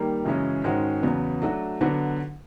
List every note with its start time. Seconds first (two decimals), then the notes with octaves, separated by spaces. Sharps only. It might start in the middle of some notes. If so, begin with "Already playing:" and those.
Already playing: D#3 G3 A#3
0.25 F#2 C#3 E3 G#3 C#4
0.64 G#2 D#3 G#3 C#4 F#4
1.03 E2 C#3 F#3 B3
1.42 F#3 A3 D4 F#4
1.81 D3 F#3 B3 D4 F#4